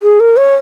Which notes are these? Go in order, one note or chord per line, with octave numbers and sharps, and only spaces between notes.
G#4
A#4
C#5